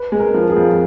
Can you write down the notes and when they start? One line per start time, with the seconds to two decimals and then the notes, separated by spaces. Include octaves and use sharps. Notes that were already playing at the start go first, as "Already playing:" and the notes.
Already playing: B4
0.12 G#3
0.20 A#4
0.34 F3
0.49 G#4
0.57 F2